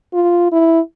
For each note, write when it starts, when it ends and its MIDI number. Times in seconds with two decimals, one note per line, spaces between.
0.13 0.47 65
0.52 0.80 64